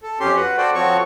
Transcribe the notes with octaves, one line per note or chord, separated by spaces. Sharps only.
A4
F2 C#4 G4 C6
F#4 B4 F#5
F#4 A4 C5 D5 G5
F3 C4 F#4 A4 C#5 C#6